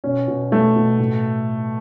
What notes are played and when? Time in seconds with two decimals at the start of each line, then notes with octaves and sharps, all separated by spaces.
0.04 B2 C#4
0.28 B2
0.51 B2 A3
0.76 B2
0.99 A2